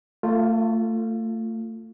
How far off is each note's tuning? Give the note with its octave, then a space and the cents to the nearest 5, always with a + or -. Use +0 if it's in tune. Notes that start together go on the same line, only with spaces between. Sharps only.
A3 +30 F4 +0